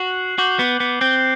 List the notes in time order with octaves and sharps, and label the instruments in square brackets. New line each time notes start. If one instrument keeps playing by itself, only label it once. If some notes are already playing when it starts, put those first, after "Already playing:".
Already playing: [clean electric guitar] F#4 [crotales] F#6 C7 F#7
[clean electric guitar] F#4 [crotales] D6 G6 C7 G7
[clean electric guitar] B3
B3
[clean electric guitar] C4 [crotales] G6 C7 G7